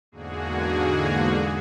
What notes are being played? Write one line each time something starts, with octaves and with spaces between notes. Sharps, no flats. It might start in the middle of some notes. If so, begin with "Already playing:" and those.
E2 G#2 D3 A#3 F#4 G#4